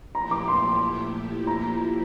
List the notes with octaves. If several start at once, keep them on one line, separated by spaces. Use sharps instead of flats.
A#2 F3 A3 E4 G4 A#5
D6
C6
A#2 F3 A#3 E4 G4 A#5